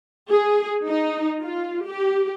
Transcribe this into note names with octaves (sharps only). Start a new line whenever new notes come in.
G#4
D#4
F4
G4